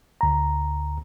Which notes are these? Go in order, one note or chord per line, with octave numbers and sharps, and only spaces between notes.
D2 A#5